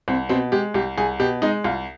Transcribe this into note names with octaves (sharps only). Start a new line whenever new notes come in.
C2 C4
B2 C4
G#3 G4
C2 G4
C2 G#4
B2 G4
G#3 D#4
C2 F4